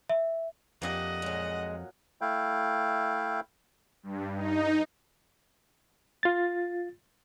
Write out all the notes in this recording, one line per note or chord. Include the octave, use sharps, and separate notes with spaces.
E5
F2 A#3 D4 G4 D#5 F#5
A#2 F#3 G#3
A3 E4 F5 G5
G2
D#4
F4 A6